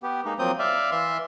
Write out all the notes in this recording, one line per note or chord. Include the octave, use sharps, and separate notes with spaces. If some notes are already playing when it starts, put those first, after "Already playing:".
B3 G4
G#3 A#3 D#4
F3 F#3 A#3 C4 D#6 G6
D5 E5 F5
E3 E5 C6